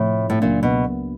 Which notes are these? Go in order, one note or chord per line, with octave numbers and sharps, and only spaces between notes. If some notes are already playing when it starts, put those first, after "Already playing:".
Already playing: A2 C3 F3 A3 C4
A2
C#2 A#2 C#3 F#3 A#3 D4
B2